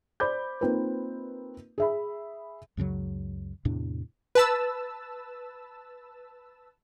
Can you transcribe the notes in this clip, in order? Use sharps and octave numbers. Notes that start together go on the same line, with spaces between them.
C5 D5 B5 D6 G6
A#3 C4 D#4 F4 B4
G#4 E5 B5
C#2 F#2 C#3 F#3
E2 A2 C3 D4
B4 A5 E6